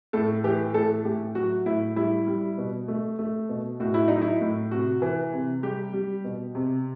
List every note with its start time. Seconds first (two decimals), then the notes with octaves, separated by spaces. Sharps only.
0.13 A2 A4
0.44 E3 G4
0.74 A2 A4
1.05 A2 G4
1.35 F#3 F#4
1.66 A2 E4
1.96 G3 E4
2.27 G3
2.58 B2
2.88 A3
3.19 A3
3.49 B2
3.80 A2 F#4
3.94 E4
4.08 F#3 D#4
4.22 E4
4.41 A2
4.71 C3 F#4
5.02 E3
5.33 C3
5.63 G3 G4
5.94 G3
6.24 B2
6.55 C3